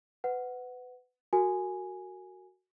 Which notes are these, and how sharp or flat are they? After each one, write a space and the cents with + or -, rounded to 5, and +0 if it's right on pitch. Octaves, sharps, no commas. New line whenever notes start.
B4 +25 F#5 +0
F#4 +0 A#4 -30 G#5 +0